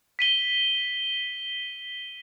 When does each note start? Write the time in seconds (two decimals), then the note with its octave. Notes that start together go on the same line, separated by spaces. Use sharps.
0.19 B6 D#7 G7